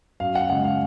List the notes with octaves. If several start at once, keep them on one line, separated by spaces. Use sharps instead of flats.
F#2 F5
F#5
C#3 G#3 F#5
F5